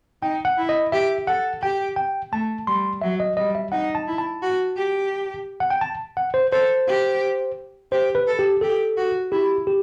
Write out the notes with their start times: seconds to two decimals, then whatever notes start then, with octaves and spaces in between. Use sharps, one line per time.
0.22 D#4 G5
0.45 F#5
0.57 E4
0.69 D#5
0.92 G4 E5
1.27 A4 F#5
1.62 G4 G5
1.96 G5
2.32 A3 A5
2.67 G3 C6
3.02 F#3 E5
3.20 D#5
3.37 G3 D#5
3.55 E5
3.72 D#4 F#5
3.95 A5
4.07 E4
4.18 A5
4.42 F#4
4.77 G4
5.60 F#5
5.70 G5
5.81 A5
6.17 F#5
6.34 C5
6.52 A4 C5
6.87 G4
7.92 G4 C5
8.15 B4
8.27 A4
8.39 G4
8.61 G4 A4
8.97 F#4
9.32 E4 G4
9.67 G4